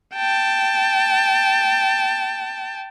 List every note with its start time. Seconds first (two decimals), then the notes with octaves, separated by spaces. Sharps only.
0.15 G5 A5